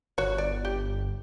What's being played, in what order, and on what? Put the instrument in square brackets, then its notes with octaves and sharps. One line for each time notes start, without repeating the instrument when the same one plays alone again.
[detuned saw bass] G1 [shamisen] F#4 C#5
[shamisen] D5
G4